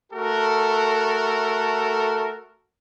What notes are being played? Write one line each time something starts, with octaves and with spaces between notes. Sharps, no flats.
A3 F#4 A4 A#4